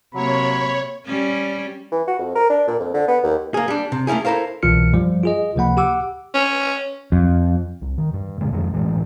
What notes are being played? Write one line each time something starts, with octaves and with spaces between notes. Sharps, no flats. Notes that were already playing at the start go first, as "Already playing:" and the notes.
C3 F#3 A#3 C#5 B5
G3 C#4
E3
F#4
F2
A#4
D4
A#2
F2
D3
B3
D#2
A#3 G#4
G3 D4
C3
A3 A#3 C#4 E4 G#4
E4 A4 A#4 C5 F5
C2 B2 E3 F4 F6 C#7
G2 F3 G3
F4 G#4 D#5
C#2 C3 F3 A#3 F#5 B5
G4 F#5 D6 E6
C#4
F2
C2
D#3
G2
A#2 D3 G3 G#3
F2 D#3 G#3
G#1 A2 E3 G#3